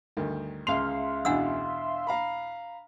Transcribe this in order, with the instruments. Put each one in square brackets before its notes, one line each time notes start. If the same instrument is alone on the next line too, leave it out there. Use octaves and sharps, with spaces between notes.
[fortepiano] D2 G2 D#3
[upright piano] C#2 F7 [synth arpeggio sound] E5 F5 C6
[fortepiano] E2 B2 [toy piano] D4 F#5 E6
[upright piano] F5 A#5 B5